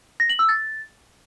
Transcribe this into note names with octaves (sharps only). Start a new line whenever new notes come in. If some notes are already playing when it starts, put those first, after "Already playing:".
A#6
F#7
E6
A6